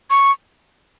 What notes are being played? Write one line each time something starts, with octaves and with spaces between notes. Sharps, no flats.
C#6